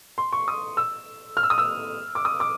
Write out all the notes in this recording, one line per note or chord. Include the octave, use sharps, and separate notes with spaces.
C6
C#6
D#6
E6
F6
E6
D#6
E6
D6
D#6
D6